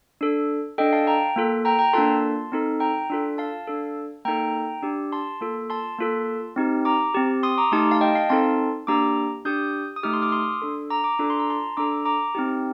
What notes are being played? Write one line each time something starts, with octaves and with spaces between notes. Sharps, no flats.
D4 A4
D4 A4 D#5 G5
F5 A5
G5 A#5
A#3 F4 A4
G5 A#5
G5 A#5
A#3 D4 F4 A4 A5 C6
C4 D#4 A4
G5 A#5
D4 F4 A4
F5 A5
D4 A4
A#3 D#4 A4 G5 A#5
D4 G4
A5 C6
A#3 F4 A4
A5 C6
A#3 F4 A4
C4 D#4 G4
A#5 D6
C4 G4
C6 D#6
A#5 D6
A3 D#4 G4 A5 C6
F5 A5
D#5 G5
F5 A5
C4 D#4 A4 A5 C6
A#3 D4 G4 A#5 D6
D4 G4 D#6 G6
D#6
A3 D#4 G4 D6 F6
C6 D#6
D6 F6
C6 D#6
D4 A4
A#5 D6
A#5 D6
D4 F4 A4 D6
C6
A#5
A5 C6
D4 A4 A#5 D6
A#5 D6
C4 D#4 G4